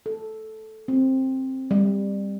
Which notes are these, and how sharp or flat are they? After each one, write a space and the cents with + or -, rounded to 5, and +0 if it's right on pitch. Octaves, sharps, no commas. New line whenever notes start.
A4 -10
C4 +10
G3 +20